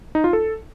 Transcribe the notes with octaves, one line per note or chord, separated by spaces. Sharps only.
D#4
F4
A4